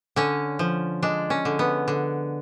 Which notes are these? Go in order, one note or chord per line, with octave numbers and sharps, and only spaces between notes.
D3 C#4
F3
G#3 D4
C#4
D3
B3
D3